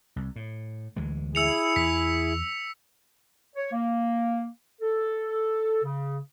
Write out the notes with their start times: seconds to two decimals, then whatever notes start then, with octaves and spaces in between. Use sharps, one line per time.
0.16 C2
0.36 A2
0.96 D2 E3 G#3
1.35 E4 G#4 E6 C#7 F7
1.76 E2 B6
3.56 C#5
3.72 A#3
4.81 A4
5.84 C#3